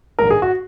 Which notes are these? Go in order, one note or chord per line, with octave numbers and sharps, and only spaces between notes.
A#1 G#2 D#3 A#4
G#4
F#4